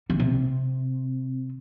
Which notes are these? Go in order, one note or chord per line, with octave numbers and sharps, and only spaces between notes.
D3
C3